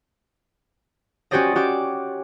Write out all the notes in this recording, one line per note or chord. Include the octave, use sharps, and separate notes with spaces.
C#4 F#4 G4 C5 D5 D#5
C#4 F#4 G4 D6